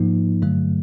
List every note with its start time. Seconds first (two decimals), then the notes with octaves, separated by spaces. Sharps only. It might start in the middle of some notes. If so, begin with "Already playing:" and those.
Already playing: G#2 F3 A#3 D#4
0.42 G2 D3 F#3 A3